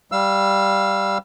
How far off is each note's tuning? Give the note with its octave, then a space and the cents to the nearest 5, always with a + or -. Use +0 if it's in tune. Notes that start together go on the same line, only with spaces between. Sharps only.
G3 +0 F5 +0 E6 +25